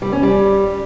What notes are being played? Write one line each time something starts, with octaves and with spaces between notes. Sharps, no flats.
G3
C#4
G3